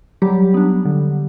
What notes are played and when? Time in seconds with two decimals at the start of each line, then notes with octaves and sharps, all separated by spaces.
0.22 F#3 G3 G4
0.54 B3 D4
0.85 D3